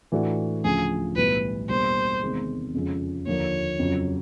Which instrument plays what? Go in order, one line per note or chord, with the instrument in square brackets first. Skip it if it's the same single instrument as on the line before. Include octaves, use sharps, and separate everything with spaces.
[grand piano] A2 E3 A3 D4 F#4
[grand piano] D2 C#3 F3 [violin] G#4
[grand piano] B1 A2 E3 G3 [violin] B4
[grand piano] E2 B2 G3 A#3 D4 [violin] C5
[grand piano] E1 E2 C3 D#3 G#3
F2 C#3 F3 G#3 C#4
[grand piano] D#2 D3 F3 A#3 [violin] C#5
[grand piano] F2 C#3 F#3